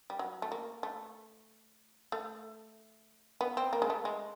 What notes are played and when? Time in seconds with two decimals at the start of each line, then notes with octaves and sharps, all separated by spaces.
0.10 G3
0.19 F#3
0.42 A3
0.52 A#3
0.83 A3
2.12 A3
3.41 B3
3.57 C4
3.73 A#3
3.82 G#3
3.90 A3
4.05 G#3